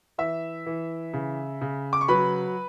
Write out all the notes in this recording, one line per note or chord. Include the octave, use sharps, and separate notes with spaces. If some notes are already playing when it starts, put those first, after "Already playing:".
E3 E5 E6
E3
C#3
C#3
D6
C#6
F#3 B4 B5